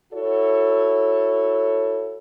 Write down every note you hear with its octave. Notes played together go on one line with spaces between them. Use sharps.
E4 F#4 A4 C#5